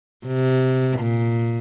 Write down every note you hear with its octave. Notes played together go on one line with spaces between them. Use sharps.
C3
A#2